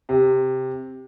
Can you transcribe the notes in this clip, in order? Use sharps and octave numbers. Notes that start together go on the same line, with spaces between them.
C3